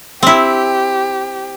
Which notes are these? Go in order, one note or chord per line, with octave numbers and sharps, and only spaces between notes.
C4 E4 G4